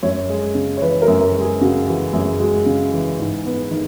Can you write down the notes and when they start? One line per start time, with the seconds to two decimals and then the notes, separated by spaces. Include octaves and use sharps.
0.03 F#2 C#5
0.29 G#3
0.55 C#3
0.77 C#5
0.81 E3 B4
1.02 A#4
1.08 F#2
1.21 A#4
1.34 G#3
1.41 G#4
1.61 C#3 F#4
1.87 E3 F#4
2.13 F#2 G#4
2.39 G#3 F#4
2.66 C#3
2.92 E3
3.19 G#2
3.45 B3
3.71 D#3